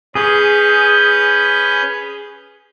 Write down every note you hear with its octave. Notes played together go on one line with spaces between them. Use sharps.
C#4 G#4 B4 G6